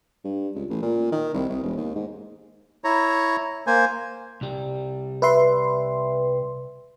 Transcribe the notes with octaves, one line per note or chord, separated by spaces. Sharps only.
G2
C#2
A1
A#2
D#3
C2
C2
E1
D#2
G#2
E4 C#5 A#5
A#3 C5 G#5
C2 G3
B4 E5 C6